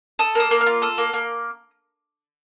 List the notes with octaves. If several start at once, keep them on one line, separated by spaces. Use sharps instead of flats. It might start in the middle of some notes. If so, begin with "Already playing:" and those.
A4 D#6
A#3 D#6
A#3
F6
F4
A4 D#6
A#3
A#3